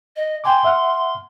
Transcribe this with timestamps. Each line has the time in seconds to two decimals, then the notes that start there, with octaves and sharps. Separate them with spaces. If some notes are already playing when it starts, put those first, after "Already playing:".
0.16 D#5
0.44 G5 G#5 C6 D6
0.64 E5 F#5 F6